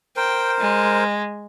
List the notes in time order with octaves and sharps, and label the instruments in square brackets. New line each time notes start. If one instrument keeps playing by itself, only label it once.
[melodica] A#4 C5 [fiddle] G5
[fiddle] G#3